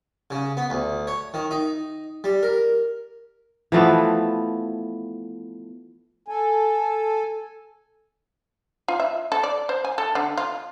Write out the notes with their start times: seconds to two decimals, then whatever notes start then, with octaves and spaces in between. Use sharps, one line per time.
0.30 C#3
0.57 B3
0.70 D2
1.07 C#5
1.34 D#3
1.51 D#4
2.24 G3
2.43 A#4
3.72 E3 F3 A3 B3
6.28 A4 G#5
8.88 F4
9.00 E5
9.32 A4
9.43 D5
9.69 C5
9.85 G#5
9.98 A4
10.15 D3
10.38 F4